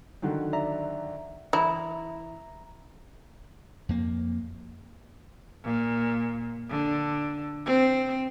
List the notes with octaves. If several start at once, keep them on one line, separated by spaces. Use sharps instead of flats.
D3 D#3 F#3
D5 E5 A#5
E3 E4 A#5
F2 A#3
A#2
D3
C4